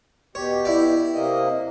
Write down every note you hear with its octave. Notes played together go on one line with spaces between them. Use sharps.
B2 G4 C#5
E4 D5
C3 A#3 D#5